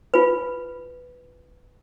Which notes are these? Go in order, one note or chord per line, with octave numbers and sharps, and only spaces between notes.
F4 B4